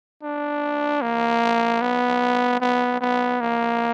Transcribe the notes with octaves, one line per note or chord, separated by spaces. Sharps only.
D4
A#3
B3
B3
B3
A#3